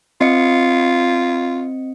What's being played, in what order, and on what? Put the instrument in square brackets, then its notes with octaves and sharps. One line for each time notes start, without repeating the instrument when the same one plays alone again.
[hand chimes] C4 D#5 C#7 [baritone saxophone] F4